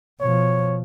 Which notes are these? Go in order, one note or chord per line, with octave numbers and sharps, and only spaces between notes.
B2 F3 C#5